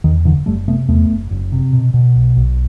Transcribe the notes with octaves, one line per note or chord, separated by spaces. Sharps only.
E2 D#3
F#1 D3 E3
F#1 G3 A3
C3 A3 B3
E2 A3 B3
F#1
F#1
C3
B2
B2
B1
B1